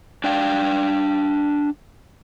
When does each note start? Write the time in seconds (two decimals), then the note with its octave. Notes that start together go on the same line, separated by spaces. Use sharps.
0.24 D4 D5 F5 G5